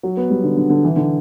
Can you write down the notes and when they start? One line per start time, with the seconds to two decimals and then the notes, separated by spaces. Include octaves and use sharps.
0.03 F#3
0.17 B3
0.30 G3
0.44 D3
0.57 D3
0.70 D3
0.85 E3
0.96 D3